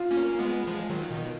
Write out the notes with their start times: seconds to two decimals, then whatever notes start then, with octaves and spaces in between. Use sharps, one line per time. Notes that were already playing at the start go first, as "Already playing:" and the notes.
Already playing: F4
0.11 A#3 C#4
0.39 G#3 B3
0.67 F3 G#3
0.90 D#3 F#3
1.11 B2 D#3